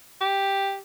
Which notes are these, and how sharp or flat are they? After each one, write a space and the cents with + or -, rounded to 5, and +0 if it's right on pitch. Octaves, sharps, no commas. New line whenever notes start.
G4 +5